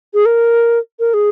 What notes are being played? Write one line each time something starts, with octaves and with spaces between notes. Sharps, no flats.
G#4
A#4
A#4
G#4